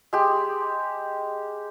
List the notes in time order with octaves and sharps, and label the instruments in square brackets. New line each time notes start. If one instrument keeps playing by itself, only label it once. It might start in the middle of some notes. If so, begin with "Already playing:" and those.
[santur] G#3 G4